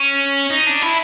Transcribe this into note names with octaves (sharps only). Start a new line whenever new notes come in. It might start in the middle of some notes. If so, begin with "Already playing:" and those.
Already playing: C#4
D#4
D4
E4